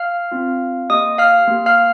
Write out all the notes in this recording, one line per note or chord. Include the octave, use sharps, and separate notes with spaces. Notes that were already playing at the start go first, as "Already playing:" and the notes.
Already playing: F5 F6
C4 F4
A#3 G4 D#5 D#6
F5 F6
A#3 G4
F5 F6